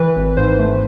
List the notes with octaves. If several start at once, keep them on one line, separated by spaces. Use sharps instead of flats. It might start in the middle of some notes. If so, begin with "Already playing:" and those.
Already playing: E3 B4
G#1
G#2 C5
A3